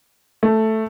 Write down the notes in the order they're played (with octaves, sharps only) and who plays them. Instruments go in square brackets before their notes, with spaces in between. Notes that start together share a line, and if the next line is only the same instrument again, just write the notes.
[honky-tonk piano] A3